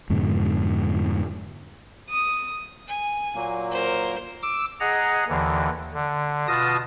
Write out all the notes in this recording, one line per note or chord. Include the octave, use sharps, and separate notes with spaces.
F2 G#2 B2 D3
D#6
G#5
A#2 F#3 A#3
A#4 C5
D6 E6
G#4 D#5 F#5 A#5
D#2 D3 E3
D3
B2 F4 A5 D#6 A#6